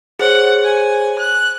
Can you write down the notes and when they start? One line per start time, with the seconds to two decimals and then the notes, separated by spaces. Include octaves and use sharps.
0.19 G#4 C5 C#5 F#5
0.64 G#5
1.19 F#6